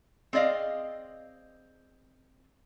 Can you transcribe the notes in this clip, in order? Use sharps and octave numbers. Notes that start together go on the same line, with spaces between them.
C4 G#4 D5 D#5 F5